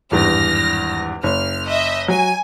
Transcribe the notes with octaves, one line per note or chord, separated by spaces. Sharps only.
G#1 E2 G2 F6 A#6
F#1 F6
D#5 E5
F#3 G#5